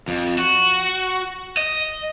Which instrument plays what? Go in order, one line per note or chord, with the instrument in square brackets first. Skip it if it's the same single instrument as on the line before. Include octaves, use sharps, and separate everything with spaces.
[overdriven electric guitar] F2
F#4
D#5